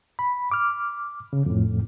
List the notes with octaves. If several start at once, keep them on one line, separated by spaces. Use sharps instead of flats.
B5
D6 F6
C#3
F2 A2